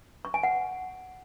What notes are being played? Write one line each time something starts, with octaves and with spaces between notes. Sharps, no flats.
C#6
G#5
F#5